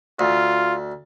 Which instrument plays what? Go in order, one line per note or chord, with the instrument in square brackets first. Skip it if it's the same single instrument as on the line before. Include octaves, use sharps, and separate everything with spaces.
[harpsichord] D2 [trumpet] F4